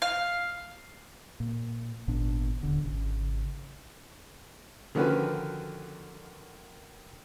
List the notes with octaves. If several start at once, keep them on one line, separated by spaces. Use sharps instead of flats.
F5
A#2
G#1 A#2 B3 D4
D#1 D3
G#1 C#3
D3 D#3 F3 C#4 F#4 B4